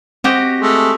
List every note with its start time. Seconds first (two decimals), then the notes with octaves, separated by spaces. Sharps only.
0.24 C4 F#4 G4 D#5
0.60 G#3 A3